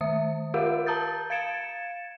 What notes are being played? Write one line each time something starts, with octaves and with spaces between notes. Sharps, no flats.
D#3 E5 D#6
F4 G4 A#4 F5 F#5
A5 A#5 D#6 G6 A6
F5 G#6 A6 C#7 D7 E7